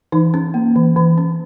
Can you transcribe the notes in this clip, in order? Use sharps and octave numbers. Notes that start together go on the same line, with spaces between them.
E3 D#4
C#4
A#3
E3
E3
C#4